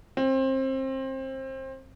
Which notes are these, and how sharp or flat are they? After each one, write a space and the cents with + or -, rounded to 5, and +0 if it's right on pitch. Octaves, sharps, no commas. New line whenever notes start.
C4 +25